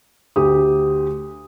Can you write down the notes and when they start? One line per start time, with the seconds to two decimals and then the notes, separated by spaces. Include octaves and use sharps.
0.36 D2 G4 D#6